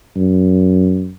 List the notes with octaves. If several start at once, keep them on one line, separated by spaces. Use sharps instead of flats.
F#2